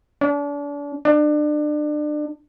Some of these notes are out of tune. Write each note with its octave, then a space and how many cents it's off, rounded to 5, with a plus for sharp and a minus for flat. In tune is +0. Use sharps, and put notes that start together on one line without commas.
D4 -35
D4 +30